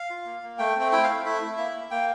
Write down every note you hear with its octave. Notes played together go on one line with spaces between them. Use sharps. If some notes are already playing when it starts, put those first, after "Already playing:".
Already playing: F5
F4
A#3
A#3
A3 G5
C4
G5
E4 G5
A3 F5
E4 E5
E4
A#3
A#3
A#3 G5